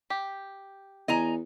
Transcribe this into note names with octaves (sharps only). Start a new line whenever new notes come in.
G4
E2 D#5 G#5 A#5